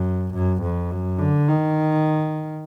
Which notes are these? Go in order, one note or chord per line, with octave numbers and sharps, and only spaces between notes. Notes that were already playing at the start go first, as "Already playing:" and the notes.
Already playing: F#2
F#2
F2
F#2
D3
D#3